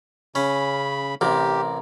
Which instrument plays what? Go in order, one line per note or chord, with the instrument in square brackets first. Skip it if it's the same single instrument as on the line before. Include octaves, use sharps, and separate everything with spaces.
[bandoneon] C#3 B5 [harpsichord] C#4
[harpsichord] A1 C3 [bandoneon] G4 [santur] A#4